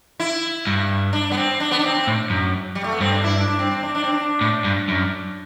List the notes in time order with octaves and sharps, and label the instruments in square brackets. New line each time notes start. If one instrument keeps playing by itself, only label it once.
[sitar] E4
[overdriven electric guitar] G2
[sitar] D4
B3
C4
D4
B3
D4
C4
C4
[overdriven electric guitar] A2
F#2
[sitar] G3
A3
B3
[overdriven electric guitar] G2 [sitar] C4
[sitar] D4
E4
D4
D4
C4
C4
D4
D4
C4
D4
[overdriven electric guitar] A2
G2
F#2